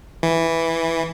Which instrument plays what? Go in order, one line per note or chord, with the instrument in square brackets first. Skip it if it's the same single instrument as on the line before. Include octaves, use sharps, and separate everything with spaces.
[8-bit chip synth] E3